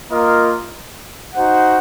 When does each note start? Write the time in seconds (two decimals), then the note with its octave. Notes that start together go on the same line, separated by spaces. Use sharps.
0.11 A#3 F4 A#4 D#5
1.35 D#4 F#4 C5 F#5